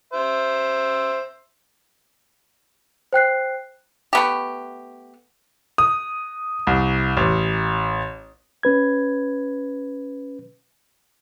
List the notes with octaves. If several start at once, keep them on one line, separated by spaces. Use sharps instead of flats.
C5 E5
C5 G5 F#6 C7
A3 B3 G4
D#6
C2
A1
C#4 B4 G#6